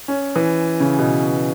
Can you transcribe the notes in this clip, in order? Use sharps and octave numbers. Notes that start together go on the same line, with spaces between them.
C#4
E3
C#3
B2